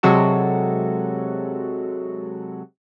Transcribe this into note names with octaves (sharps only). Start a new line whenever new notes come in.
C3 F#3 G#3 F#4 A4